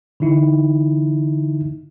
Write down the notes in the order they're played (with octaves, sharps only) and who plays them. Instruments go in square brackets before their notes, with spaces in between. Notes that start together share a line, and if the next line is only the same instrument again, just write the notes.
[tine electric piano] D3 E3 D#4 E4